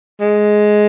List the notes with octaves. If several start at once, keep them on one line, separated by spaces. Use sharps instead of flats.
G#3